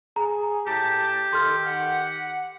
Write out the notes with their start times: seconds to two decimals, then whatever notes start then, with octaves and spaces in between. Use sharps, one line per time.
0.16 G#4 A#5
0.67 A2 G4 A5
1.33 D#3 A4 C6 F6
1.65 F#5